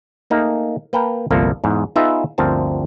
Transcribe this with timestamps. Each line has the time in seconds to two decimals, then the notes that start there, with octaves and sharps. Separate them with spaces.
0.30 A3 A#3 D#4 G#4
0.93 A#3 B4 G5 A5 A#5
1.30 G1 C2 F3 A#3 A4
1.64 E2 G#2
1.96 B3 D#4 F4 G#4 B4 E5
2.38 G1 D2 F3 C4 A#4 A5